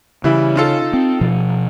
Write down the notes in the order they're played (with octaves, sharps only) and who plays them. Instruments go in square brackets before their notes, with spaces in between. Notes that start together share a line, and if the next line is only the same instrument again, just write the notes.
[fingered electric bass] C#3 [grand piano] E3 G3 E4
[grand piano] D#4 F4 A4
[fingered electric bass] C4
B2 F3